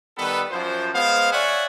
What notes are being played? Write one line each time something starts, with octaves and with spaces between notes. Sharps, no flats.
D#3 G3 B3 A4 B4
F#2 F3 C5
G#3 B3 C5 F5
C#5 D5 E5 F#5 G#5